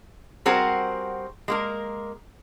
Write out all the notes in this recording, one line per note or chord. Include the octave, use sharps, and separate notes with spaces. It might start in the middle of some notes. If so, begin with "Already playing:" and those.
G3 C4 F#4 G#4 A#4 C5
G#3 A#3 A#4